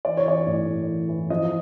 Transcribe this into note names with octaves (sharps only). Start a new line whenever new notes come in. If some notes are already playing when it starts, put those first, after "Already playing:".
E3 D5
C#5
E3 D5
A2
A2
E3
E3
F3 D#5